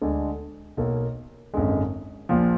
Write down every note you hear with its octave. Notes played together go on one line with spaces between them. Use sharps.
D2 D3 G#3
B1 B2 A#3
G#1 F#2 D3 G#3
A#1 A#2 F3